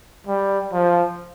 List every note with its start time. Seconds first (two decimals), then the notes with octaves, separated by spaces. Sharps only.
0.27 G3
0.73 F3